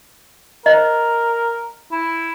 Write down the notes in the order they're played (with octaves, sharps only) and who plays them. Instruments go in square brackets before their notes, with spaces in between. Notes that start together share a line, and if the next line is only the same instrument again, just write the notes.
[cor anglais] A#4 [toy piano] C5 D#5
[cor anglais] E4